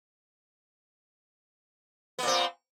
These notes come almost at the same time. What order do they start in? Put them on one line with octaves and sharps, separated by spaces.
B3 A#2 C4